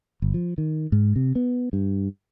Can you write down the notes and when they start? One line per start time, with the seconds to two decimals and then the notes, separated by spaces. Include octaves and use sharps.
0.22 G1
0.34 F3
0.58 D#3
0.92 G#2
1.16 C3
1.35 B3
1.73 G2